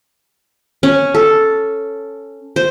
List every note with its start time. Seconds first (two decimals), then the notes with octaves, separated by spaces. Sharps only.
0.83 C#4
1.14 A4
2.56 C5